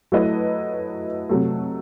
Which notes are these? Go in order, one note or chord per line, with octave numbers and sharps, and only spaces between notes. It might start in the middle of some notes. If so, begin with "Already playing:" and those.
F#3 A3 E4 B4 D#5
C3 F#3 A3